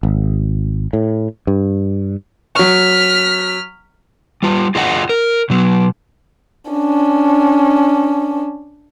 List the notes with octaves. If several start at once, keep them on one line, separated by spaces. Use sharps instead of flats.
G#1
A2
G2
F#3 C#6 F6 B6
G3 F4
F4 G#4 D#5 F5 F#5
A#4
B2 F#3
C#4 D4